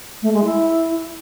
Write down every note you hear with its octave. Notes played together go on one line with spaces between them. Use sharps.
A3
G#3
E4